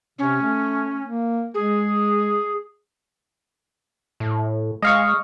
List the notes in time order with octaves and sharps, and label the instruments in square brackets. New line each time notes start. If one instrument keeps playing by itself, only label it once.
[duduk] C3 [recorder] C#4
[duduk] A3
A#3
[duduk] G#3 [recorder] G#4
[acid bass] A2
[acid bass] G#3 [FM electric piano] D#5 F5 C#6